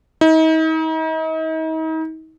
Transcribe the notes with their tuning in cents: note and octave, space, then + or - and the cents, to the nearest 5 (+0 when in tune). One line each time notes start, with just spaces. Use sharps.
D#4 +40